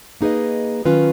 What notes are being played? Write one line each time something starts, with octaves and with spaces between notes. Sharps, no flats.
A#3 D#4 G#4 B4 D#5
D#3 F#3 C#4 F4 B4